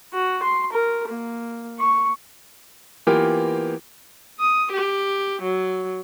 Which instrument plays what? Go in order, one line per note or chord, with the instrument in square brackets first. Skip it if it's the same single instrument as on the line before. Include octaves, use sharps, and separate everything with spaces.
[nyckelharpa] F#4
C6
A#4
A#3
C#6
[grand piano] E3 A#3 B3 F4 G4 A#4
[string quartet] D#6
G4
F#3